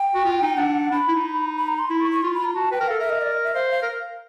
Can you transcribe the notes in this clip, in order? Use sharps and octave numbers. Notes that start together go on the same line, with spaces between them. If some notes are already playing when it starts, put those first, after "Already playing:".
Already playing: G5
F#4
F4
D#4
D4 F#5
D4 B5
E4
D#4
B5
A#5
C6
E4 B5
C#6
C#6
F4 C6
B5
F4 A#5
F#4 A5
B4 G5
A#4
A4 F5
A#4 E5
D#5
D5
D#5
E5
C5 F5
F5
A#4